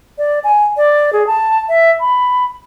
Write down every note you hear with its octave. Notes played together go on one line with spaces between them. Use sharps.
D5
G#5
D5
G#4
A5
E5
B5